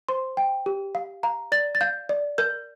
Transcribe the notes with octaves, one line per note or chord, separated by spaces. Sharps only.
C5 C6
G5
G4
F5
F5 A#5
D5 A6
A6
F5 G6
D5
A#4 G6